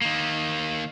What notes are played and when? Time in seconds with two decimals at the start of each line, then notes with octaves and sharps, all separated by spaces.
0.01 D#3 A#3